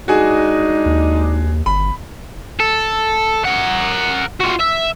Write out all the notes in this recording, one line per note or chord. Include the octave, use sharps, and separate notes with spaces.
G#3 D4 D#4 F#4 G#4
D#2
G1 B5
A4
A#4 F#5
F4 F#4
E5